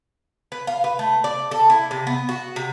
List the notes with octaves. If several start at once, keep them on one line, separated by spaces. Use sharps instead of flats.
B4
F5
B4
A3
D5
A4
E4
C3
B3
F#4
C3